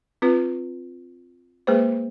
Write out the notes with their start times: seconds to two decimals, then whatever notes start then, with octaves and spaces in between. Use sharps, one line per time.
0.22 C4 F4 B4
1.67 G#3 A#3 G#4 B4 C5